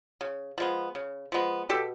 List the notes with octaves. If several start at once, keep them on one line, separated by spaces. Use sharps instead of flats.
C#3
F3 G#3 B3
C#3
F3 G#3 B3
B2 G4 A4